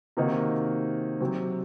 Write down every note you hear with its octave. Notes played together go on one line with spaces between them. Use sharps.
C3 D#3 A#3 D#4 F#4
C3 F#3 C4 F#4